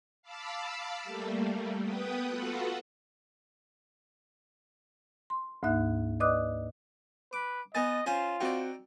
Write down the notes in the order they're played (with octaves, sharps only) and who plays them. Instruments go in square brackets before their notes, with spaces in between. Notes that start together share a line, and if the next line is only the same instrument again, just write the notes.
[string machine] F5 A5 B5 D6 E6
G3 A3 A#3
B3 B4 G5 D#6
F4 F#4 A4 B4 F#5
[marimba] C6
D2 G#2 A#3 D#4 E5 F#6
B4 D5 D#5 D6 D#6 F#6
[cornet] B4 [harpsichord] D6
[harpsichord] B3 D#4 G#5 [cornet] D#5 [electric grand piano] A6
[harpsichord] C#4 C5 G#5 [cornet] F4
[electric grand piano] C4 F#4 G5 [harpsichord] D#4 D5